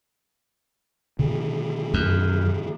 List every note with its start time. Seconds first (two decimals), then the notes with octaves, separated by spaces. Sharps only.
1.19 B2 D3 D#3
1.94 F#2